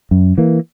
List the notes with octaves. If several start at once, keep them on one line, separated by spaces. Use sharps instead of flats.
F#2
E3 A#3